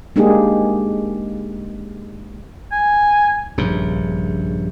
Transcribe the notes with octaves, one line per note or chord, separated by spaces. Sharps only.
G#3 A#3 D4 D#4 G4 G#4
G#5
A#1 G2 C#3